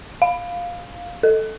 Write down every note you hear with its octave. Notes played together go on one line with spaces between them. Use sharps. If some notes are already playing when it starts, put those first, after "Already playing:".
F5
A4